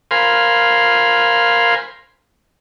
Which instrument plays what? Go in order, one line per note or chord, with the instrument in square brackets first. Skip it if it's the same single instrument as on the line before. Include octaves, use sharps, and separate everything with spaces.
[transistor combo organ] A#4 C5 F5 G#5 B5 C6